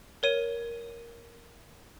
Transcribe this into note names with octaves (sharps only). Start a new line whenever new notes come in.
A#4 C#5 D#7